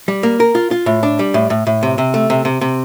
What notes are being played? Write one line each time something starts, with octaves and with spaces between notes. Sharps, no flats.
G3
A#3
A#4
F4
F4
A2
D4
G3
A2
A2
A2
C3
C3
A3
C3
C3
C3